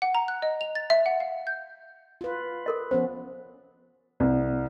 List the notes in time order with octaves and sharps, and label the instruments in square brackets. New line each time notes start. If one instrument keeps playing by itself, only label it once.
[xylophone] F#5
A#5
F#6
D#5
F7
A6
E5
F#5
F5
G6
[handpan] F4 B4
[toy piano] A4 A#4 D#5
[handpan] F3 B3 C#4 [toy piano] C5
[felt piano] C2